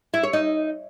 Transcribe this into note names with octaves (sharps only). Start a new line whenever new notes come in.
E4
C#5
D#4